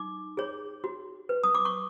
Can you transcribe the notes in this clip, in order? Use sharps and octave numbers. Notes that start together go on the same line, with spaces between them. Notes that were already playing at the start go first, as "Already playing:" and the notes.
Already playing: D#4 D6
G#4 C#5
F#4
B4
D#6
D6
C#6